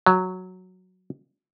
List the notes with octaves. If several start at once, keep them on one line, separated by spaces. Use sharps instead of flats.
F#3